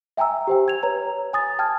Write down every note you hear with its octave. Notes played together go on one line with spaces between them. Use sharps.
E5 G5 G#5 A#5 E6
G4 C5 G5
G#6 F7
B4 C#5 A#5
G#5 D#6 A6
G5 A5 F6 G#6